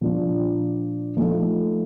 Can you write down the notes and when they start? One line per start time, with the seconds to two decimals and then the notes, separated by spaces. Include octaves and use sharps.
0.01 A#2 F3 A#3 D4 F4
1.17 F3 A3 D#4 A4